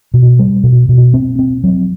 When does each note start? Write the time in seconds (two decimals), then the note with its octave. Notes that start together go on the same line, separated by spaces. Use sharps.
0.14 B2
0.39 G3
0.63 B2
0.89 B2
1.14 C4
1.39 C4
1.64 F#3